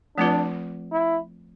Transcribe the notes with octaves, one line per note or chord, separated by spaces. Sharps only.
F3 A3 C4 D4 F4 B4
E4